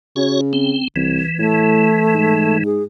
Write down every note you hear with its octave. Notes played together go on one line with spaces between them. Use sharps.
C#3 F#4 C#5
C4
C2 E3
A2 A3
G#2
G#4